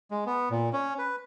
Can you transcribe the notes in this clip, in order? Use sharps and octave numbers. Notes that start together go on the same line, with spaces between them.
G#3
B3
A#2
C#4
B4